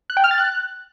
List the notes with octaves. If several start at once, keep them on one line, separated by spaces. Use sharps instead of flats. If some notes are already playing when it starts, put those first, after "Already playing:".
F#6
G5
F6
A6
F#6